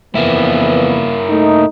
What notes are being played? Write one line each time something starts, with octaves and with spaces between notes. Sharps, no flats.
F2 E3 A#3 B3 E4
A3 D#4